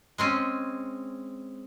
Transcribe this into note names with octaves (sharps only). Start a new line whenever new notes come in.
G#3 C4 C#4